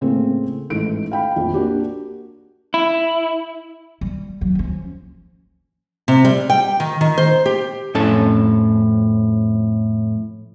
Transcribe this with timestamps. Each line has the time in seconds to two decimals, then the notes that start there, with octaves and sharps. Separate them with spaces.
0.01 A2 C#3 A3 A#3 C4
0.70 A1 G#2 A3 D7
1.12 F5 G5 B5
1.36 A#1 F2
1.54 A#3 D4 F#4 G4
2.74 E4
4.01 G3
4.41 E3 F#3
4.55 F3 C#4
6.08 C3
6.25 G3
6.50 G5
6.80 D#3
7.01 D#3
7.18 C5
7.46 G4
7.95 F2 A2 C#4 A4 A5